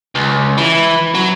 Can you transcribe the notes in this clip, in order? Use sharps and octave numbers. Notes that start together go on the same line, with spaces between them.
C#2
E3
F#3